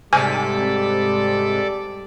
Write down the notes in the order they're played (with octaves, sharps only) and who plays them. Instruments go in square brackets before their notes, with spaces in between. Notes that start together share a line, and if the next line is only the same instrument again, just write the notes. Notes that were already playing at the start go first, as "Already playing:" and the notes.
[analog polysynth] G#2 C3 B6 [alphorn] G3 [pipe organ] A4 D5 [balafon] G#5